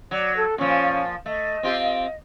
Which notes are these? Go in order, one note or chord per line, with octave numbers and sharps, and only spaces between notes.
F#3 D5
A4
A#2 F3 C#4
A3 D#5
C4 F4 G4